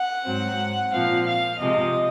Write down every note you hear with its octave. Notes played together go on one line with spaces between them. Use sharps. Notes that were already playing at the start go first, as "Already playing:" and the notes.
Already playing: F#5
G#2 F#3 C4
A#2 F3 C4 F5
F5
C3 F3 G#3 D#5